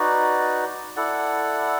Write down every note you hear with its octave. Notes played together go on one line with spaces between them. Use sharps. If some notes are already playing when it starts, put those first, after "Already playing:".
Already playing: D#4 F#4 B4 D5
E4 A4 D5 F#5